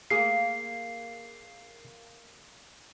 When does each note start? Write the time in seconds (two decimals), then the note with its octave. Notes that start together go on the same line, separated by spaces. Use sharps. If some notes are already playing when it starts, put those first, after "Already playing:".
0.10 A#3 G#4 C7